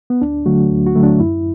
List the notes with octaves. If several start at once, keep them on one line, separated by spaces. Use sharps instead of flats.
B3
D2 D4
D3 F#3 A3 F#4
D2
F#4
D3 F#3 A3
D4
F#2 E4